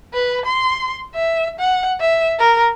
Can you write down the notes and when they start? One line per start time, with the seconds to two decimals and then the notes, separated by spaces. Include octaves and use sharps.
0.14 B4
0.46 C6
1.15 E5
1.60 F#5
2.00 E5
2.39 A#4